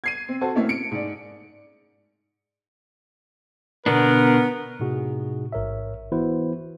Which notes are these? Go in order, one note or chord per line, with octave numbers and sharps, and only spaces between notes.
G#6 C7 D#7
C4
F#4 A4 C5 A5
A3 A#3 C4 C#4 E4 A4
C#7 D7
G#2 D5
B2 D3 B3 D4 A#4
A2 C3 D#4 F#4 G#4
A1 G#2 A#4 C#5 E5
E3 B3 E4 F#4 B4 C5